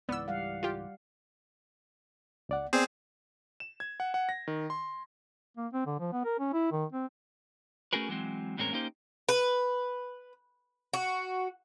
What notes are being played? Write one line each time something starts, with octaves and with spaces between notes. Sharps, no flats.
C#2 G#2 E3 B3 D5 E6
G3 F5 F#5
F4 G4
C#2 D5 F#5
B3 C4 G#4 C5 D5
E7
G#6
F#5
F#5
A#6
D#3
C6
A#3
C4
D3
F3
B3
A#4
C#4
E4
D#3
C4
A3 C#4 F#4 G#4 A#4 B4
E3 F#3 G#3 C4
E2 A2 G#3 C4 C#4 A#4
A#3 C#4 D#4 G4 C5
B4
F#4